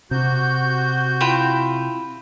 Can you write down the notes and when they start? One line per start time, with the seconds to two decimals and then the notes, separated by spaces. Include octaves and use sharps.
0.11 C3 F#4 G6
1.21 E4 F4 G5